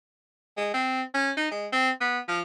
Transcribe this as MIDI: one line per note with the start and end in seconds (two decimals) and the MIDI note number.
0.57 0.71 56
0.74 1.02 60
1.14 1.31 61
1.37 1.49 63
1.51 1.67 56
1.72 1.90 60
2.01 2.19 59
2.28 2.41 53